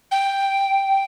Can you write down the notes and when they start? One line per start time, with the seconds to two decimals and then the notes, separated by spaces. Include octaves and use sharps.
0.11 G5